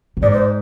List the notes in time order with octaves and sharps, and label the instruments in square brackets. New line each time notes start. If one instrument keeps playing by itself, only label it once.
[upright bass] A#2
[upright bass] G#2 [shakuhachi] D5
[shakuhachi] C5